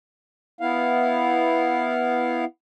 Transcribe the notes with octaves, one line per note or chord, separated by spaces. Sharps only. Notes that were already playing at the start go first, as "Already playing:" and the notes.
B3 E4 F5